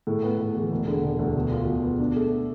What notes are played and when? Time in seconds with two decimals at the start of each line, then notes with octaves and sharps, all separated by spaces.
0.07 A2
0.23 B3
0.39 A2
0.55 E3
0.72 E1
0.88 D3
1.04 E1
1.19 D2
1.36 B2
1.52 F4
1.67 B2
1.83 B3
1.99 D4
2.16 A3